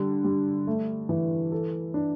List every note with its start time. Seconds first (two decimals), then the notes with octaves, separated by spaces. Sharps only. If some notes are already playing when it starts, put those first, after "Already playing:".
Already playing: D3 G3
0.24 G3
0.67 A3
1.09 E3
1.52 A4
1.94 D4